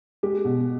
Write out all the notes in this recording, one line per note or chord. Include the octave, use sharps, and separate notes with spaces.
G#3 G4
B2